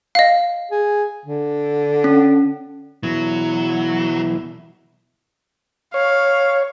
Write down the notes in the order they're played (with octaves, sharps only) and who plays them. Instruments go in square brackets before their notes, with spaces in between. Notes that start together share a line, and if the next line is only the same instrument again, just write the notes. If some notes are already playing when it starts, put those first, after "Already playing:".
[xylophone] D#5 F5
[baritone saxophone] G#4
D3
[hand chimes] C#4
[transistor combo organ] B2 E3 E4 [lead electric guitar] F#3
[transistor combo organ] C#5 [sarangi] F5